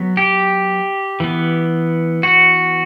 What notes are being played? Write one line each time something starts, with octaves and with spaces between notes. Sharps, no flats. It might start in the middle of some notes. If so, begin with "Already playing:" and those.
Already playing: F#3 B3
G4
E3 B3
F#4